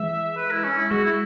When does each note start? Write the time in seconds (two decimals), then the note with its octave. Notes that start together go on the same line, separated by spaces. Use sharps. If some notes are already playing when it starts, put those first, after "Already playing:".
Already playing: E3 G#3 E5
0.37 B4
0.51 E4
0.64 C#4
0.78 E4
0.91 G#3 F#4
1.04 E4